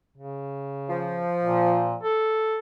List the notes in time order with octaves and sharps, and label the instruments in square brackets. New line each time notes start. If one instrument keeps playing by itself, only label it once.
[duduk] C#3
[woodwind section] F3
[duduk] A#2
A4